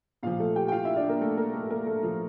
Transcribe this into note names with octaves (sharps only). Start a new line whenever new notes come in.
A#2 F3 F4 F5
A3 A4
G4 G5
G5
F4 F5
E4 E5
D4 D5
A#3 A#4
A3 A4
A#3 A#4
A3 A4
A#3 A#4
A3 A4
F3 F4